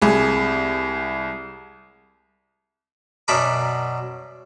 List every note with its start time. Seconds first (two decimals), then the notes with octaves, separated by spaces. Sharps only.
0.02 C2 G#4
3.28 F#2 B2 D4 A#4 B5 D6